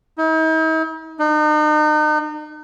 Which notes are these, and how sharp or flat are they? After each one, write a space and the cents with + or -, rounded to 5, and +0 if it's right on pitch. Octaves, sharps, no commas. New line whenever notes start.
D#4 +45
D#4 -40